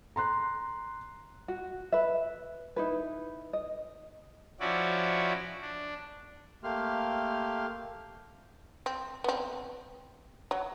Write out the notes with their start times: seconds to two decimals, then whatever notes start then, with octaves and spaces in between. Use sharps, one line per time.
0.16 A#5 C6 F#6
1.48 F#4
1.92 B4 E5
2.76 D#4 E4 B4
3.53 D#5
4.60 F3 C#4 E4 F#4 D5
5.62 D4
6.63 A3 A#3 G4 C6 F6
8.86 C4
9.24 B3 C4
10.51 F#3